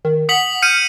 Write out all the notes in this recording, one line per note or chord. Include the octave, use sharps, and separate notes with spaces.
D#3
F#5 D#6 B6 F#7
F6 G6 C#7 D#7